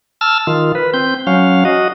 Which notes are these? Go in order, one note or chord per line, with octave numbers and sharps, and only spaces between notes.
A5 E6 F6
D#3 F4
B4
C4 G6
F#3 C#4 F5
F#4 D#5